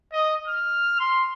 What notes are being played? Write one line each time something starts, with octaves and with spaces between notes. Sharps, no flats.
D#5
F6
C6